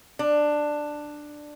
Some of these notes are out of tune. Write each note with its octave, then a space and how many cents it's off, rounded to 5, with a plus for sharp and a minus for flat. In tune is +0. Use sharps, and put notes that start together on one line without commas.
D4 +10